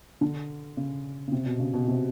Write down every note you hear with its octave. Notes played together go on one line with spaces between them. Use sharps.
D3
C#3
C#3
C3
B2
C#3
B2
C3